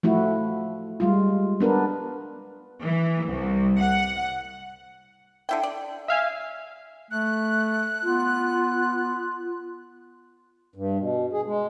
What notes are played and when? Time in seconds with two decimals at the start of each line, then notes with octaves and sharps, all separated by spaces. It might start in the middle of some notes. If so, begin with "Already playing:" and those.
0.03 F3 A3 E4 F#4
1.00 G3 G#3 F4
1.60 B3 D4 A#4 B4
2.82 E3
3.26 C2
3.79 F#5
5.49 D3 E4 G5
5.63 D5
6.08 E5 F5 G#5
7.11 A3 F#6
8.03 B3 F4
10.75 G2
10.98 B2
11.32 G#4
11.46 G#3